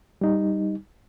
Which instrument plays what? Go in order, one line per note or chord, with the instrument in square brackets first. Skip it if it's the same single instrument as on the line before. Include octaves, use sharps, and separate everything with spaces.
[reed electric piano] G3 D#4